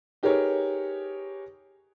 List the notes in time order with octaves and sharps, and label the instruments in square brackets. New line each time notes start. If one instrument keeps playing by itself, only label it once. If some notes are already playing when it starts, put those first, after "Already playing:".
[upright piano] D#4 G4 G#4 A#4 B4 C#5